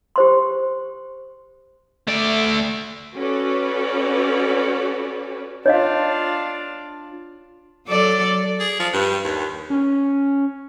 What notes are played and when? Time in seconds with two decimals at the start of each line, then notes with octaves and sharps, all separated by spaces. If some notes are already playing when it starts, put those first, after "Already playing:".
0.16 G4 C5 C6
2.07 A3 D5
3.15 C#4 F#4 A4 B4 C#5 D5
5.66 D4 F4 C#5 D#5 F5
7.87 F#3 A4 D5
8.60 G#4
8.79 F3
8.93 G2
9.25 D#2
9.70 C#4